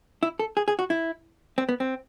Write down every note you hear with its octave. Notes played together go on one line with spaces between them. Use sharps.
E4
A4
G#4
G#4
F#4
E4
C4
B3
C4